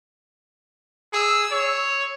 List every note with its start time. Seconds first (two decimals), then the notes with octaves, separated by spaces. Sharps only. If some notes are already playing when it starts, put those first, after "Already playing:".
1.13 G#4 E6
1.51 C#5